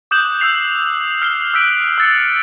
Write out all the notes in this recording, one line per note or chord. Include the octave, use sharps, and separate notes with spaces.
D6 D#6 F#6 G6 E7 F#7
E6 G6 C7 F7
F6 C7 G7
E6 F#6 B6 D7
E6 A6 C#7